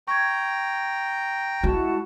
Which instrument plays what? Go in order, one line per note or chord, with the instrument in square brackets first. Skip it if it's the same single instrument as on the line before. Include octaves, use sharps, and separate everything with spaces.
[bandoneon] G5 A#5 [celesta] C#6 G#6
[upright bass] G#3 [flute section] E4 F#4 A5